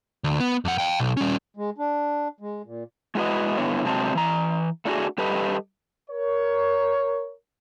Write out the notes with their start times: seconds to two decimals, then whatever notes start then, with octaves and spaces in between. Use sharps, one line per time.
0.24 D2
0.40 B3
0.65 F2 F#5
0.78 F5 G5
1.00 B1
1.17 G3 C#4
1.57 G#3
1.78 D4
2.40 G#3
2.65 A#2
3.15 G#3 A3 E4 F#4 B4 D#5
3.57 G2 D3 B3 E4 C#5
3.85 C3 F#3 G#3 C4 A5
4.15 E3 A#5
4.85 A3 D4 F4 F#4 G#4
5.18 G3 G4 A4 B4 D#5
6.10 A#4 C#5